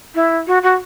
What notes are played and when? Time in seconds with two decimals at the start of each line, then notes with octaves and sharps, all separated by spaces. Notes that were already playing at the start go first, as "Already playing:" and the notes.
0.15 E4
0.47 F#4
0.63 F#4